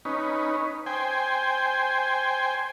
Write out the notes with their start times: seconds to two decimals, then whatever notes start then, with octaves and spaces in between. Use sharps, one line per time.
0.05 C#4 D#4 B4
0.86 C5 G5 G#5